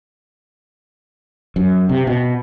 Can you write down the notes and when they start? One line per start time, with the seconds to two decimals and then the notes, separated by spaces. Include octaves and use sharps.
1.56 F#2
1.89 C3
2.07 B2